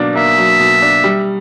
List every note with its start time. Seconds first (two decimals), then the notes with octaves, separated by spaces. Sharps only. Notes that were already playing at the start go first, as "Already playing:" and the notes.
Already playing: B2 F#3 A#3 D4
0.16 A#3 E5
0.38 F#3
0.60 B2
0.82 D4
1.04 G3